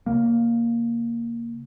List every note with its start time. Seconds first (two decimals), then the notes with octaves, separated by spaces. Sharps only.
0.06 C#3 A#3